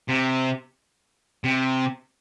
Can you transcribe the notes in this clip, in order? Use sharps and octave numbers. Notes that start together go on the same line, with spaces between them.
C3
C3